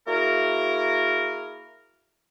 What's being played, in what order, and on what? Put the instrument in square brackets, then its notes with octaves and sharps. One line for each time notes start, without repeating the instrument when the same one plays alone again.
[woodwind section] A#3 E4 F#4 G#4 A#4